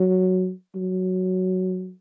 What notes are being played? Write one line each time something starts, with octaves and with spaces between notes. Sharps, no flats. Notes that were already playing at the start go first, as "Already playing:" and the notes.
Already playing: F#3
F#3